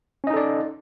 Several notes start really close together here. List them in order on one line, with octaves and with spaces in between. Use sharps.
C#4 D#5 D#4 A4 D5